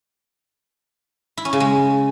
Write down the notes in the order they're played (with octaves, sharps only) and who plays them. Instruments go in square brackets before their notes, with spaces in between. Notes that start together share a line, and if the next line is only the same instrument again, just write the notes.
[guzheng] E4
C#4
C#3
G#3